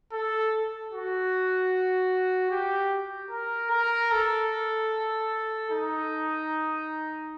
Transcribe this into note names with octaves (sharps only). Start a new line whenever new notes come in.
A4
F#4
G4
A#4
A#4
A4
D#4